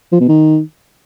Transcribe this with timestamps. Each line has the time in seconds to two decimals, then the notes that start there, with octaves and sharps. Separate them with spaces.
0.12 F3
0.20 B2
0.28 D#3